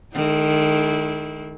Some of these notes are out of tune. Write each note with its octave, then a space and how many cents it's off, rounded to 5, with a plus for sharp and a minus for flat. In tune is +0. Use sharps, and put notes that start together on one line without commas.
D#3 -20 G#3 +35 E4 -30